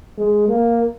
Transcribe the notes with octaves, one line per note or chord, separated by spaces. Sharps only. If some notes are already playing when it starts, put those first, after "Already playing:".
G#3
A#3